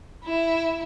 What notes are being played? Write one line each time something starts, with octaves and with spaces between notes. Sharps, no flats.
E4